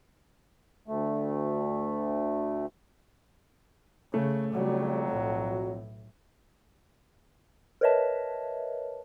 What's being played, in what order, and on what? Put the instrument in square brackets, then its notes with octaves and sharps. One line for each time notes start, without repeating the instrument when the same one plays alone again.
[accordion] D2 A3
[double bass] C#3 [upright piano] A3
[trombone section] F2 F#3 [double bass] C#3 G3
[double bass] B1 A2
[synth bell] A#4 B4 C#5 D#5 E5 A5